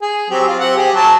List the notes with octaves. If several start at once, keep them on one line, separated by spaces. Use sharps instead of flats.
G#4
F#3 C4 G4
F4
C4 G4 F#5
G4 G#4
F#3 A5